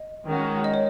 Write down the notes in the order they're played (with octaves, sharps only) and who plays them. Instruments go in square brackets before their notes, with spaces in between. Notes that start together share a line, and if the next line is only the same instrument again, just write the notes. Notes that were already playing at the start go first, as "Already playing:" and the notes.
Already playing: [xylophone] D#5
[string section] D#3 G#3 C#4 F#4
[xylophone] D#5
C#5